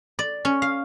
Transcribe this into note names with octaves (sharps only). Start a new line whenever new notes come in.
D5
C#4
F5